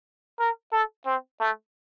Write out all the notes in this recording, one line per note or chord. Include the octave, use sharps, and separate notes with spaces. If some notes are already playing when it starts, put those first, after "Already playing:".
A#4
A4
C4
A3